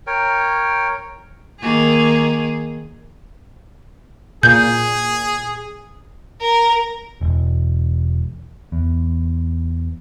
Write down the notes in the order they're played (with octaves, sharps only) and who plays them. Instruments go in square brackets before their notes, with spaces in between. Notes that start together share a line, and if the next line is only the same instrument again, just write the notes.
[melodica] A#4 C#5 G5
[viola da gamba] D#3 A#3 G#4
[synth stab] A#2 [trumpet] G#4 [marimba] G6
[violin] A#4
[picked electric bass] E1
E2